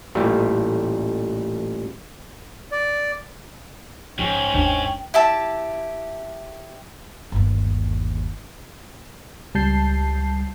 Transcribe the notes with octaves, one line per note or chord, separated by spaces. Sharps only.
A1 A#2 G3 A3
D5
A#1 G#2 C#4 G5
G1 D#2 D4
E4 G4 E5 A5
G1 D#2
C#2 G3 A5 G6 C7